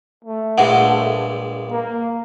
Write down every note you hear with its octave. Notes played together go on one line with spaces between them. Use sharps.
A3
A#1 G2 G#3 F#5
A#3